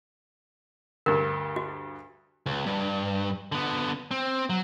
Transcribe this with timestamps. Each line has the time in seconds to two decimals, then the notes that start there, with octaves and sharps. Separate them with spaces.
1.06 D2 G2 A#4
1.56 F#4
2.46 C#2
2.66 G2
3.52 D3 B3
4.11 C4
4.50 F#3